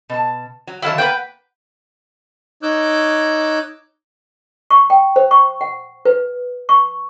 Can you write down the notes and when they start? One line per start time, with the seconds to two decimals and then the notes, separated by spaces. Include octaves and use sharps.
0.09 B2 A5
0.67 F#3
0.82 D3 D#3 F#3 E4 F5 A5
0.98 A#3 B3 B4 F#5 G5
2.63 D#4 C#5 D6 E6 F#6 G6
4.71 C#6
4.90 G5
5.16 C5
5.31 C#6
5.61 F#5
6.05 B4
6.69 C#6